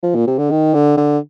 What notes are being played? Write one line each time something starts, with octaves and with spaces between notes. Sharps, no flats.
F3
A#2
C3
D3
D#3
D3
D3